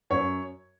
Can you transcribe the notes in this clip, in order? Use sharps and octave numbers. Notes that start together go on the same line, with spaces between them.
F#2 C#5